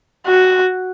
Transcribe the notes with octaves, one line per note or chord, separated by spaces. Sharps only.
F#4